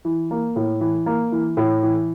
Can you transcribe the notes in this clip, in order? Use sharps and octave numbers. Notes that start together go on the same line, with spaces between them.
E3
A#3
A2
E3
A#3
E3
A2
E3